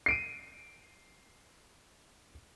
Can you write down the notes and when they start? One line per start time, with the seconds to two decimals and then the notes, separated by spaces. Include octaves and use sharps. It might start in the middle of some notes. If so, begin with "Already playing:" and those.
0.06 C7 D7 D#7